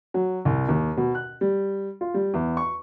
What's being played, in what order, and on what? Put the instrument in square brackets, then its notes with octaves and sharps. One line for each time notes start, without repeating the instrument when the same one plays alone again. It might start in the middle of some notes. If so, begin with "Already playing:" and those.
[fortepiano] F#3
C2
D#2
B2
F#6
G3
F4
G3
E2
C#6